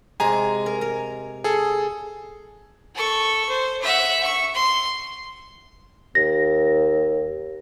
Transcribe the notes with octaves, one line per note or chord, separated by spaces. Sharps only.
C3 G#3 G#4 G#5 A#5
A#4
A#4
G#4 A4
A4 C#6
C5
E5 F#5
C#6
C6
D#2 A#6